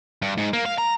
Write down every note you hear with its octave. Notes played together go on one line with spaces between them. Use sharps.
G2
G#2
A#3
F5
A#5